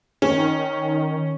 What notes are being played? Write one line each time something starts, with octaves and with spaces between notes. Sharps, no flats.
D#3 C#4